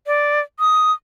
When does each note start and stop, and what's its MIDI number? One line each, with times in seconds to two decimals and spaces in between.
0.07 0.40 74
0.60 0.92 87